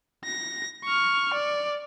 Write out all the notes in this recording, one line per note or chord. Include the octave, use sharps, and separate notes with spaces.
A#6
C#6 F6
D5